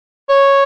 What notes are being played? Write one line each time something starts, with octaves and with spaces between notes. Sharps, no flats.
C#5